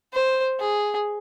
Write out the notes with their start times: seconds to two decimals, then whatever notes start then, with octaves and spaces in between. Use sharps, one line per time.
0.13 C5
0.59 G#4